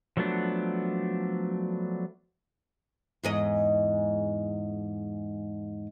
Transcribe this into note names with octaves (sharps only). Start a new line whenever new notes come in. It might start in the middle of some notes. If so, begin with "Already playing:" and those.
F3 F#3 A3 B3 D4
E2 G#2 D#5